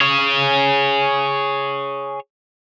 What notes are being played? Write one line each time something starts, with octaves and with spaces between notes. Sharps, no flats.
G#4 C#5